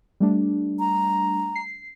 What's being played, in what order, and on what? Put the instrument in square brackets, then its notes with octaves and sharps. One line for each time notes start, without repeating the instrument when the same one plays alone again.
[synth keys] G3 A3 D4
[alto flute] A#5
[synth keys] C7